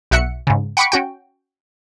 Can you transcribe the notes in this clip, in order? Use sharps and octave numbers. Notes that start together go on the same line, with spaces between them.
B1 F#4 E5 F#6 C#7
G#2 C#3
F#5 G5 B5 C#6 D6
C#4 F#4 G5